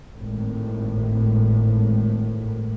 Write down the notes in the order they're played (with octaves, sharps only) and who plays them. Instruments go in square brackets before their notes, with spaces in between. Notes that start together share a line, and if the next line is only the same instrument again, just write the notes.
[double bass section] G#1 A2